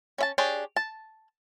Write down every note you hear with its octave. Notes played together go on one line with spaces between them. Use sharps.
C#4 E5 A5
D4 G4 G#4 C#5
A5